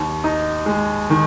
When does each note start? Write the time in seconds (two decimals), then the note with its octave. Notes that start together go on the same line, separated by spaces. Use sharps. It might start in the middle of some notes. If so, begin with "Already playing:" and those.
Already playing: D#2
0.24 D#4
0.66 G#3
1.10 D#3